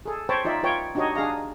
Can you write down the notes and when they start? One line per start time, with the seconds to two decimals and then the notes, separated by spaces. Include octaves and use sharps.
0.06 G#4 A4
0.29 C5 C#5 G5 A5 B5
0.45 D#4 F4 D5 E5
0.63 F4 B4 C#5 G5
0.95 D4 D#4 F#4 G4 C#5 D#5
1.15 D4 G#4 F5 A#5